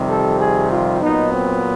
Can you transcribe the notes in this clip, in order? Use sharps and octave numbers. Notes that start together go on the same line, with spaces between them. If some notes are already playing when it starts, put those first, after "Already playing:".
Already playing: F2 C3 D#3 G3
A4
G#4
F4
A#2 F#3 B3 D#4
C4